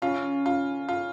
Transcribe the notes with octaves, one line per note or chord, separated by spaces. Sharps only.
C#3 C#4 F4
F4
F4